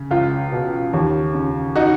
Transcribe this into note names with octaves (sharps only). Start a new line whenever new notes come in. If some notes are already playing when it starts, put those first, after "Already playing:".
Already playing: C#3
C#2 F4
B2
D#2
C#3
D#4 F#4